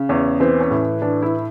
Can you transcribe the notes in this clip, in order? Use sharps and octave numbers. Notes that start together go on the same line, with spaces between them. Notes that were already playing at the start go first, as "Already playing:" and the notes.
Already playing: C#3
E2 C#4
E3 C4
C#4
A2
E3 D4
E4